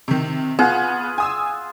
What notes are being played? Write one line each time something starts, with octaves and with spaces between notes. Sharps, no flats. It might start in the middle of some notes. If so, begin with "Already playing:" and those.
C3 D#3
B3 F4 G#4 F#5
G#5 D#6 E6